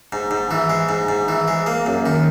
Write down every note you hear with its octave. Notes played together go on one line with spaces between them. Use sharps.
G#2
G#2
E3
G#3
G#2
G#2
E3
G#3
A#3
F#2
D#3